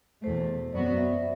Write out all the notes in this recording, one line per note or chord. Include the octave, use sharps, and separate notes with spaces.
E2 B2 A3 C5
F#2 F#3 B3 F#4 D5
E5